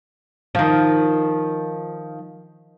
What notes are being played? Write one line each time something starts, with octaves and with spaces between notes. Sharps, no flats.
D#3 F3